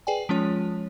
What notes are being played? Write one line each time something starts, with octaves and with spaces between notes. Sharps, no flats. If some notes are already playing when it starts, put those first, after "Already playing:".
G#4 B4 D5 G5 G#5
F3 G#3 C#4 F4 C#5